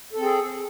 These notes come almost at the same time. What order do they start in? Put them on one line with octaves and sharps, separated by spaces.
A4 C4 G#4